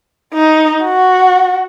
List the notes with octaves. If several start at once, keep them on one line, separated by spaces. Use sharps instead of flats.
D#4
F#4